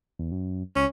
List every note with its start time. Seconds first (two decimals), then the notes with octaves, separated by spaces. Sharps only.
0.19 E2
0.32 F#2
0.76 C#2 C#4